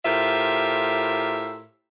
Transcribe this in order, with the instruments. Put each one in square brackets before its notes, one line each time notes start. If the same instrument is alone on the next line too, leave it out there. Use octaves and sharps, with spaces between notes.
[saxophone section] A2 F4 G4 A#4 C5 E5